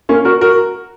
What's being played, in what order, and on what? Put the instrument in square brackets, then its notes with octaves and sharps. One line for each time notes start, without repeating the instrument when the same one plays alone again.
[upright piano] A#3 C#4
F#4 A#4
F#4 A#4